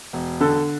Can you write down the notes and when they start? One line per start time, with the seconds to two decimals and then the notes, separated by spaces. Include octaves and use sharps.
0.13 E1
0.41 D3 A4